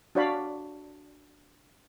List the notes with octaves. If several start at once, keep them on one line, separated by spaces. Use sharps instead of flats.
D4 F#4 C#5 D5 F5 B5